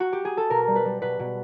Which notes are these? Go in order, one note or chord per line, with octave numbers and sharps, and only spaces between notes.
F#4
G4
G#4
A4
B2 A#4
G3
B4
G3
B2 B4
B2